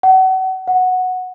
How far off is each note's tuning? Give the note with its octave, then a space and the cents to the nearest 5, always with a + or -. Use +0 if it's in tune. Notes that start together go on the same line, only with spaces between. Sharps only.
F#5 +35
F#5 -5